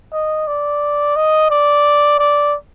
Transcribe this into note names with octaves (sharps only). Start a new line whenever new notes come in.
D#5
D5
D#5
D5
D5